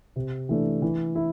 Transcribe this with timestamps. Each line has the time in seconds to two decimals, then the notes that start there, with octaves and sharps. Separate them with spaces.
0.16 C3
0.49 E3 A3 D4
0.82 E3
1.15 E4